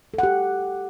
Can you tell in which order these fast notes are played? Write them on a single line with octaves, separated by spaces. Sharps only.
A4 F#5 G4